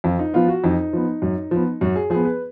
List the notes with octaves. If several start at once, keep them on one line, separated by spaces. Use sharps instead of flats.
F2 F4
D#4
F3 B3 F4
F#4
F2 D#4
F3 B3
F#2
F3 B3
F#2 F#4
G#4
F3 B3 G#4
B4